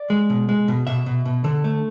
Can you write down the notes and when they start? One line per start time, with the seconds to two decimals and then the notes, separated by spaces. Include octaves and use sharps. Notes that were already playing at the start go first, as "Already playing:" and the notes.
Already playing: D5
0.10 G#3
0.30 B2
0.49 G#3
0.68 B2
0.87 B2 E5
1.06 B2
1.26 B2
1.44 D3 A4
1.64 A3